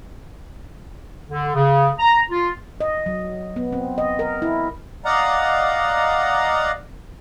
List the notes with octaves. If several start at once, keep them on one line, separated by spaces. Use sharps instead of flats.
D3
C#3
A#5
F4
D#5
F#3
B3
C4
D#5
A#4
E4
D5 D#5 F5 F#5 A#5